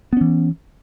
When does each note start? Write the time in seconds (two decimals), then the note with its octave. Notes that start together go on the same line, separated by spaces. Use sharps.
0.13 B3
0.17 C#4
0.21 E3